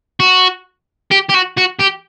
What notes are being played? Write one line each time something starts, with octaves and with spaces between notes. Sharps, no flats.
F#4
G4
G4
F#4
F#4
G4